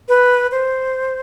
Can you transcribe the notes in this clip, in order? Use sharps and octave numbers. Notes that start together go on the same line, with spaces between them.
B4
C5